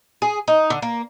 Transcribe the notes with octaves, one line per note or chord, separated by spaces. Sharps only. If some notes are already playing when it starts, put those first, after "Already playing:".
G#4
D#4
D3
A#3